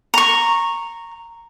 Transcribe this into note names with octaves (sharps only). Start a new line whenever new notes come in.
A#5 C#6